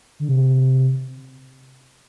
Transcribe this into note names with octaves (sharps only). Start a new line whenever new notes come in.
D3
C3